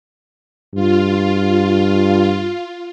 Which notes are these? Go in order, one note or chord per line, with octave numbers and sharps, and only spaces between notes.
G2 F4